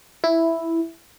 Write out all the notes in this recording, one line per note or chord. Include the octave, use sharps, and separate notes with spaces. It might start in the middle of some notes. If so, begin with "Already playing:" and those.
E4